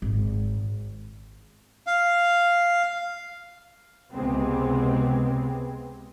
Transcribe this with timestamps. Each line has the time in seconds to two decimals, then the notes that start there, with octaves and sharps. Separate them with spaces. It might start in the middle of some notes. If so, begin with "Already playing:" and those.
0.02 G#1
1.87 F5
4.11 C#2 C3 G#3 B3 C4